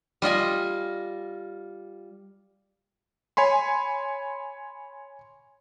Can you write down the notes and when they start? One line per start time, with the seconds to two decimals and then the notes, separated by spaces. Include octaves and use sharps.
0.22 G3 F4 D#5 G#5
3.37 C#5 G#5 B5 C6